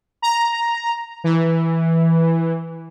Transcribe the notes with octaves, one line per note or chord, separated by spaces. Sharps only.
A#5
E3